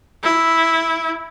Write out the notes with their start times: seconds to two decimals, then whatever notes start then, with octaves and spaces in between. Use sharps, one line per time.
0.23 E4